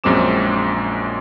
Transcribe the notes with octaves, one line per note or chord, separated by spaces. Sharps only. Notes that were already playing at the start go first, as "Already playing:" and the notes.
A#1 F#2 G#3 C4 D6 E7